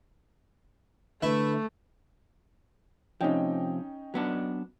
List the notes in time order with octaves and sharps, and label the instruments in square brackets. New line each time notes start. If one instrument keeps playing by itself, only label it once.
[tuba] D3 [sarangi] A3 [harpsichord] E4 B4 E5
[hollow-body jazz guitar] C3 F3 [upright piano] C#4 D#4 G5
[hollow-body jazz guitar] F#3 B3 D4